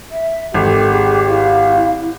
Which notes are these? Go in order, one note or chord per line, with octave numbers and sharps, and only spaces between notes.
E5
G#1 G4 A4 D6
G#4
E4 F5